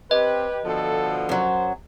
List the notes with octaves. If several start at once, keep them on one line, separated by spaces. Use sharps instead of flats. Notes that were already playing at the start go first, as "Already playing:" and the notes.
C4 G4 B4 D#5
B2 D3 F3 A4
F#2 F#3 C5